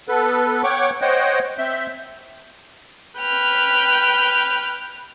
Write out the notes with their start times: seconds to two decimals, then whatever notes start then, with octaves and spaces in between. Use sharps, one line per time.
0.08 B3 A4 B4
0.64 C#5 F#5 G5 C#6 D6
1.02 C5 C#5 D#5 F#5 G5
1.58 C4 E5 G6
3.18 B4 G5 F6